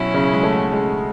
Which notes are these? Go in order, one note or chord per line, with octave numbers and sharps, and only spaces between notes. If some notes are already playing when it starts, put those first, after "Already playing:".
Already playing: B2 F#3 C#4 E4
C#3
G#3
A3
G#3